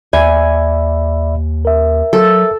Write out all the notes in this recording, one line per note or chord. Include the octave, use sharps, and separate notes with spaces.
D#2 D5 E5 G#5 B5
A#4 E5
F#3 A4